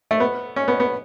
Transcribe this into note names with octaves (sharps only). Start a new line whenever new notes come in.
A3
B3
C#4
B3
B3